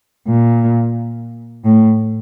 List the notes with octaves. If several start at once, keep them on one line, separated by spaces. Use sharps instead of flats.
A#2
A2